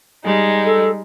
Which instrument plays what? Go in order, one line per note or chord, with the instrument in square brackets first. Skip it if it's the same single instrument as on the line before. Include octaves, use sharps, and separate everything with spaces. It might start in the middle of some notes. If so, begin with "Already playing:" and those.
[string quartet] G3 G#3 D#4
[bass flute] A4